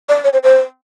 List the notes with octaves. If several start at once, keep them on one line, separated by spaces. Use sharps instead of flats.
D5
C#5
C5
C5